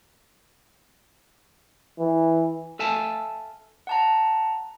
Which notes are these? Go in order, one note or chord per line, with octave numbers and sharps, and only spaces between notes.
E3
A4 E5 F5 G#5 A5
F#5 A5 A#5